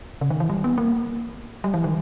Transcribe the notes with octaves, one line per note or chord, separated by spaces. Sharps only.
C#3
D#3
E3
G3
B3
A#3
G3
E3
D#3